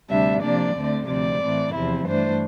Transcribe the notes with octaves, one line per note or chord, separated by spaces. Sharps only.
D2 C3 G3 D4 E5
C3 F3 A#3 D4 D5
D2 D3 A3 C4
D2 C3 F3 C4 D5
A2 E3 A3 C4
E2 C3 F3 C4 E4
G2 E3 A3 D4 C5